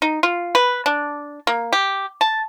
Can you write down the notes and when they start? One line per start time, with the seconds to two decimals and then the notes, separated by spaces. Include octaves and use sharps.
0.02 D#4
0.23 F4
0.55 B4
0.86 D4
1.47 A#3
1.73 G4
2.21 A5